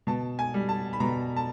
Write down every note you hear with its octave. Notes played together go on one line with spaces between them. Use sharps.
B2 A5
G#5
G3
A5
B5
B2 A#5
A5